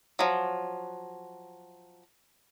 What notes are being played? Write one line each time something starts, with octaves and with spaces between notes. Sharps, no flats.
F3 F#3